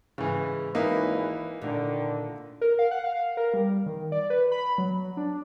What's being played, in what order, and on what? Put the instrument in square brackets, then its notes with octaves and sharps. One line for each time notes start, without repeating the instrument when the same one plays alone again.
[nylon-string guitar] G#2 [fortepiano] C#3 E3
[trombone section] G#1 G#3 B4 [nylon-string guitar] E3 [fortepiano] A#3 D#4 E4
[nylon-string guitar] A#2 [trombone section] D3 D#3
[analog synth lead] A#4
F5
F#5
F5
A#4
G3
D#3
D5
B4
B5
F#3
D4